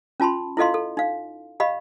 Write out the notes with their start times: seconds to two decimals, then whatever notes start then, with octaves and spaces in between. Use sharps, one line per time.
0.20 C#4 F4 A5 B5 C6
0.57 E4 F4 A4 D#5 F5 C6
0.74 A4
0.97 D#4 F5
1.60 G4 D#5 F5 B5